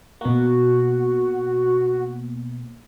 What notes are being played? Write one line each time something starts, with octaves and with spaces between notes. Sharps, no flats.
B2 A#3 F#4